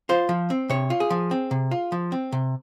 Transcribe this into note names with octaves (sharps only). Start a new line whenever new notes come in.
F4 C5
F3
C4
C3 C#5
F4
G#4
F3
C4
C3
F4
F3
C4
C3